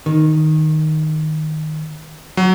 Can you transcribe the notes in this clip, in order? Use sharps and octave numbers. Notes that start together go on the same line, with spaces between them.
D#3
F#3